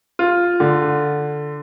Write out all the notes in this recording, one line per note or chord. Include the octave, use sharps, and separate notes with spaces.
F4
D3